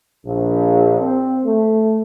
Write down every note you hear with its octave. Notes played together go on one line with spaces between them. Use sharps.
A#1
C4
A3